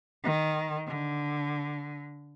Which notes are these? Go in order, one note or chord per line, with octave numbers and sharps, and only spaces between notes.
D#3
D3